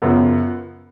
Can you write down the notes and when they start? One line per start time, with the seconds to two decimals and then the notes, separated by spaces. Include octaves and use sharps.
0.02 F#2 C#3 F3 B3